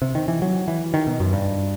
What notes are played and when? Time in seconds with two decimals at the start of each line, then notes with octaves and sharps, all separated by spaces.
0.02 C3
0.15 D#3
0.28 E3
0.42 F#3
0.68 E3
0.94 D#3
1.07 B2
1.20 F#2
1.33 G2